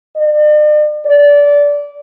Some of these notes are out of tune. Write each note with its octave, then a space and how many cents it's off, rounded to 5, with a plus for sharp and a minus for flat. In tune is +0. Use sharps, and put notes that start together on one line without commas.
D5 +45
D5 -20